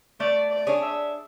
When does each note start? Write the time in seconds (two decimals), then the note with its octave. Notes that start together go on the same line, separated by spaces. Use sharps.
0.20 A3 D5
0.50 D5
0.67 D4 G#4 C#5
0.82 E5